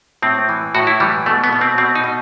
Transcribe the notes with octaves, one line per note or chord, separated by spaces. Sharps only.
A2 C4
E3
A2 F#4
E4
E3 G3
B2 A3
B3
B2
C4
B2 C4
D#4
B2